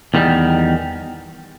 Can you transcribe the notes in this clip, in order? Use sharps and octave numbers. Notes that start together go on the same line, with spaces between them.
E2 D#3 G3